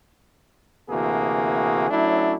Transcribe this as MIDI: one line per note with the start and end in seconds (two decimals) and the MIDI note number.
0.90 1.88 38
0.90 1.88 48
0.90 1.88 52
0.90 1.88 58
0.90 1.88 66
0.90 1.88 68
1.90 2.34 54
1.90 2.34 57
1.90 2.34 61
1.90 2.34 62
1.90 2.34 64